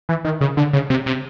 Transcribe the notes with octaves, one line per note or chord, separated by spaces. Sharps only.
E3
D#3
C#3
D3
C#3
C3
C3